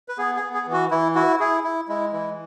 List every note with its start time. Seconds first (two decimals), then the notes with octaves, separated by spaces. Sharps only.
0.08 B4
0.18 B3 G#4
0.36 G#4
0.42 B3
0.54 G#4
0.67 E3
0.73 F#4
0.91 E3 E4
1.15 E4 F#4
1.40 E4 G#4
1.64 E4
1.88 G#3 E4
2.13 E3 E4